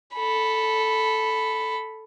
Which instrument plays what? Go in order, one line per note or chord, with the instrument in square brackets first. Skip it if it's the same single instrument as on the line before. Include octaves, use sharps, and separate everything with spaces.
[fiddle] A4 B5